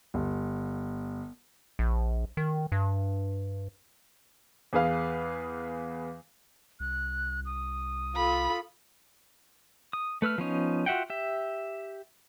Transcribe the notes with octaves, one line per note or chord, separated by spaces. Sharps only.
G1
A#1
D#3
G2
E2 G#4 B4 F5
C2 F#6
D#6
F4 A4 B5
D#6
A3 B4 E6 F6
F3 B3 C#4 D#4
F4 F#4 E5 F#5 G5
G4 E5